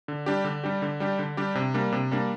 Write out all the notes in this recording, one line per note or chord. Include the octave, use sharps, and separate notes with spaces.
D3
G3 D4 G4
D3
G3 D4 G4
D3
G3 D4 G4
D3
G3 D4 G4
C3
G3 A#3 D4
C3
G3 A#3 D4